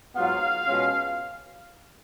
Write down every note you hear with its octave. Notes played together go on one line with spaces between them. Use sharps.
G#2 F#3 B3 F4 F5
B2 G#3 C#4 F4